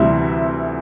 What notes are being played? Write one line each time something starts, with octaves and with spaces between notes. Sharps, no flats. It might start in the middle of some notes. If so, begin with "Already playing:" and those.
Already playing: D2 C3 E3 G3 E5